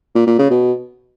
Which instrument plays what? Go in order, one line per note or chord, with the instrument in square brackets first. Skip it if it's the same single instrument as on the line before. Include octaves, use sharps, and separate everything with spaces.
[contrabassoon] A#2
A#2
C#3
B2